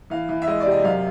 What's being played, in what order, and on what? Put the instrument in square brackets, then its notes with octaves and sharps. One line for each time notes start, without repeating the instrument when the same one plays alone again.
[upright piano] E3 F5
E3
E5
G#3 D#5
D5
C3
D#5
F#2 F5